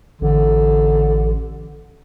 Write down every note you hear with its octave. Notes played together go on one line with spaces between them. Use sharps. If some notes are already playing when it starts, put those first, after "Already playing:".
A1 D3